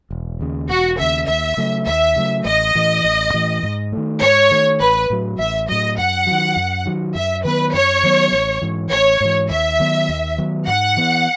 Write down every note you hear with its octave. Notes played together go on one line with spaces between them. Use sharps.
E1
D#2 C#3
E1 F#4
D#2 C#3 E5
D#2 E5
C#3 F#3 A3
D#2 E5
C#3 F#3 A3
A1 D#5
A2 E3
A1
A2 E3
G#2
D#3 A3
G#2 C#5
D#3 A3
A1 B4
A2 F#3
A1 E5
A2 F#3 D#5
F#2 F#5
D#3 F#3
F#2
D#3 F#3
F#2 E5
D#3 F#3 B3 B4
F#2 C#5
D#3 F#3 B3
A1
G#2 E3
A1 C#5
G#2 E3
D#2 E5
D#3 F#3 B3
D#2
D#3 F#3 B3
G#2 F#5
E3 B3